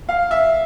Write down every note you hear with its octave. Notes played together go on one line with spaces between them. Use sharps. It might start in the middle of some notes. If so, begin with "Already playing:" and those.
F5
E5